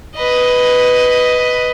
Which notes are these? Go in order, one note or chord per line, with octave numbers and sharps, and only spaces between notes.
B4 D#5